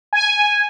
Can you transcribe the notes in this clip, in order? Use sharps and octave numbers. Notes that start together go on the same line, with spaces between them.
G#5